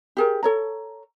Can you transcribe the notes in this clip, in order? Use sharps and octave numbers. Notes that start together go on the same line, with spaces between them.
G4 G#4 A#4
A4 C#5 A#5